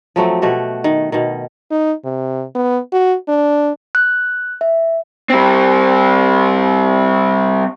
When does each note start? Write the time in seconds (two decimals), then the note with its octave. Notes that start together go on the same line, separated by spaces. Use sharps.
0.16 F3 F#3 A3 C4
0.42 B2 A3 F#4 G4
0.84 D#3
1.12 B2 D#3
1.71 D#4
2.05 C3
2.55 B3
2.92 F#4
3.28 D4
3.95 F#6
4.61 E5
5.30 G3 C4